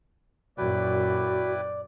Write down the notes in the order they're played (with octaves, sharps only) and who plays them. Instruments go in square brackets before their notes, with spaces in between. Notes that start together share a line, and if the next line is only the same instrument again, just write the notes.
[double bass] F#2 A#2 [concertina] E4 B4 G5 [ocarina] F#4 [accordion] D5